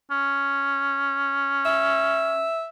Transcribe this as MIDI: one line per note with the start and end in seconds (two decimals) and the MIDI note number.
0.11 2.49 61
1.65 2.68 76